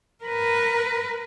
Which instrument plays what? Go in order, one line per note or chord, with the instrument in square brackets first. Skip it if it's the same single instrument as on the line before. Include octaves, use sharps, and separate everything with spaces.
[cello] A#4 B4